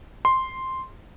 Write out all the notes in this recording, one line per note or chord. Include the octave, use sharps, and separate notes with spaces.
C6